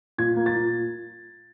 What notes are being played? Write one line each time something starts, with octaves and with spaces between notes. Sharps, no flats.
A#2 G#6
A#3
A6
A#2